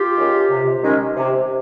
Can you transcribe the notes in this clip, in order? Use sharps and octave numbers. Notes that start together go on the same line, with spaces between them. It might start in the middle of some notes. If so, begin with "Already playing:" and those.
Already playing: F4 G4
D#3 G#3 C#4
C3
D#3 G#3 C#4
C3